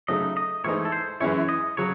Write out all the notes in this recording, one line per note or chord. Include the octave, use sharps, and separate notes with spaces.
C#3 F#3 A3 D#4 D#5
D#5
G#2 E3 A3 D#4 C#5
A4
C5
F#2 E3 G#3 C#4 E4 C#5
D#5
C#3 F#3 C#5